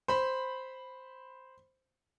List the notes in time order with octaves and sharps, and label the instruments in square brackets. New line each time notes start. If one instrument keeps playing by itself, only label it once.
[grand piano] C5 B5